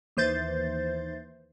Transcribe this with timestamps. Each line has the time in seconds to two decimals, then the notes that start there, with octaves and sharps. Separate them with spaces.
0.17 D#2 E3 C5 G6 A6